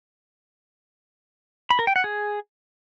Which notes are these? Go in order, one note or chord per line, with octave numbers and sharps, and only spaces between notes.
B5
A#4
G5
F#5
G#4